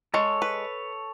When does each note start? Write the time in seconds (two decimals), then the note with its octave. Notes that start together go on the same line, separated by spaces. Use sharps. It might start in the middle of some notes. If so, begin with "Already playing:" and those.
0.14 G#3 A4 C#5
0.42 B4